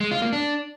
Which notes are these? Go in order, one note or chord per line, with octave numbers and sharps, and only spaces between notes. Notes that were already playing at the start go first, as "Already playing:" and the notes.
G#3
F4
A#3
D4